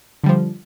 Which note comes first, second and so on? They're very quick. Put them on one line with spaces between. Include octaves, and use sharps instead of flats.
D3 G3 F3